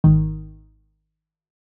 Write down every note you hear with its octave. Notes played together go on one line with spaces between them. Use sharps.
G#1 D#3